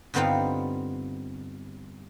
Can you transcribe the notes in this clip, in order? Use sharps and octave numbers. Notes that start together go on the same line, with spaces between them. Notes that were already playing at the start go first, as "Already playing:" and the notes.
G2 D3 B3 C4 D#4 F4